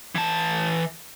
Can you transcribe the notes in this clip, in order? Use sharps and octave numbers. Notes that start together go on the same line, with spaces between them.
E3 A5